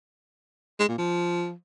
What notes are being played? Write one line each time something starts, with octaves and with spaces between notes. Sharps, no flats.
G#3
A#2
F3